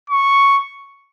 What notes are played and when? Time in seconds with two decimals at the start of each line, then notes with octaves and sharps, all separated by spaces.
0.10 C#6